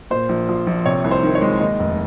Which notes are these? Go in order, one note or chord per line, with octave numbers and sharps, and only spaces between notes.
A#2 C5
A#1
F3
A#1
C3 C#5
C2
C5
D#3
C#5
G#3
D#2 D#5
F1